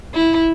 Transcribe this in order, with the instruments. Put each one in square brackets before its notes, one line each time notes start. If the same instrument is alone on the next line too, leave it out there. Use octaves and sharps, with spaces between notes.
[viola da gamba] E4